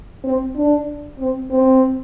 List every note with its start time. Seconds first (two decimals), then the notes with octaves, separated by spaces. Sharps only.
0.24 C4
0.56 D4
1.19 C4
1.51 C4